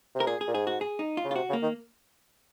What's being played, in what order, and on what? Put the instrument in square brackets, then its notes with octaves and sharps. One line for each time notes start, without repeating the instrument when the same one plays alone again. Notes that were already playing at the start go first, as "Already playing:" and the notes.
[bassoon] C3
[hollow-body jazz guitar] A#4
[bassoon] A#2 [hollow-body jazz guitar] G#4
[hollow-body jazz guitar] G#4
[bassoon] A#2
[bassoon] G#2 [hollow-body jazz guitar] G#4
[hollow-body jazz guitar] F#4
G#4
D#4
F4
[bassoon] C#3
[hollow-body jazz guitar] F4
[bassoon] C3 [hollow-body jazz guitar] F#4
[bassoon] C#3
[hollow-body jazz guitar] A#3
[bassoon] D#3